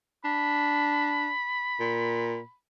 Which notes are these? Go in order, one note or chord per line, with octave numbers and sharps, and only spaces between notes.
D4 B5
A#2